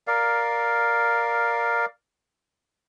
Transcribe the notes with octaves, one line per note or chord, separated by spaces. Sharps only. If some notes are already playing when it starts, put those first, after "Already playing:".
A#4 D5 F5